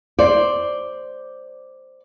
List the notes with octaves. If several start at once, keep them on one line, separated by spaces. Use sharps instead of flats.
C5 D5